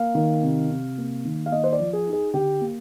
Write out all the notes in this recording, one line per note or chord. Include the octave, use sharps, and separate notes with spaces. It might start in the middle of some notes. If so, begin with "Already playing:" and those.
Already playing: A#3 F5
D#3
C3
C3
A#3
D#3
F5
A#3 D#5
C5
D5
F3
G#4
D#4
G#4
D3 G4
A#3